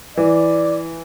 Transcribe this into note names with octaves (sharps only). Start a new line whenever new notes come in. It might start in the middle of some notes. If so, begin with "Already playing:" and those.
E3 D5